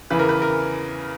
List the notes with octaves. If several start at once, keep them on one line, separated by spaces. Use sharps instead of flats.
E2 C#3 E3 B4
A#4
B4
A#4